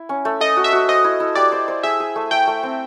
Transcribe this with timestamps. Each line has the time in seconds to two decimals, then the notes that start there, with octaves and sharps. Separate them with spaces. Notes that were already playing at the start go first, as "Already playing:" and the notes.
Already playing: E4
0.09 C#4
0.25 A3
0.40 A4 D#5
0.57 F#4
0.64 E5
0.72 F#4
0.88 C5 D#5
1.04 E4
1.20 E4
1.35 G4 D5
1.52 C5
1.68 C5
1.83 G#4 E5
2.00 G#4
2.16 A3
2.31 A3 G5
2.47 A3
2.63 C4